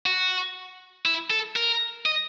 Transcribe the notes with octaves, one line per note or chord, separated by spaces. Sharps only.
F#4
E4
A4
A#4
D#5